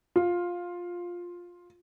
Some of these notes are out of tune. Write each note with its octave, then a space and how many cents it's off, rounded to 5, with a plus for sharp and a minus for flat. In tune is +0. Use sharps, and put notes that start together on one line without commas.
F4 +10